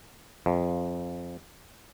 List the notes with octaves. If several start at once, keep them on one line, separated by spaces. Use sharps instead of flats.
F2